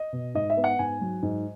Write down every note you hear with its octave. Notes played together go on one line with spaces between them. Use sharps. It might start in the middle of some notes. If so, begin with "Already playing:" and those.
Already playing: D#5
B2
G#2 D#5
E5
B3
F#5
G#2 G#5
F#3
G#2